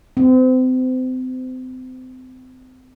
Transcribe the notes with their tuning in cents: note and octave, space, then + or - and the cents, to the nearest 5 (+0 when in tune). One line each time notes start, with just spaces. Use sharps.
C4 -35